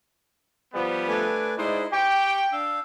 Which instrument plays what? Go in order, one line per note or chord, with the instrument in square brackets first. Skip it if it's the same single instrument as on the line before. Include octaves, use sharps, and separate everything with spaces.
[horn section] F3 G3 B3
[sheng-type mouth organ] A3 B4 G#5 [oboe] D4
[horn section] G#3 C5 D5 [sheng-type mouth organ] D#4 E4
[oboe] G4 [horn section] G5 [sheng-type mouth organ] C#6
[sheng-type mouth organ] D4 F5 [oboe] E6